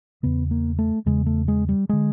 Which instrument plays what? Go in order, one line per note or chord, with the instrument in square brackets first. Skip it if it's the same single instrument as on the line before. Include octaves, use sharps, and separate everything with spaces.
[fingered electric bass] E2 C#3 B3
A#3
A3
E2 C#3 G#3
A3
G#3
G3
D3 G#3